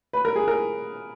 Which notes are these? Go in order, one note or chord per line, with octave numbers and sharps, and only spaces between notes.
B4
A#4
G#4
A#4